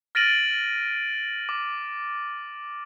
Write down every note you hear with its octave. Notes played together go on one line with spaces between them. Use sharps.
F6 A6 A#6 D7 D#7 F#7
D6